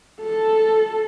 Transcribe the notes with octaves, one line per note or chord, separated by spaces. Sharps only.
A4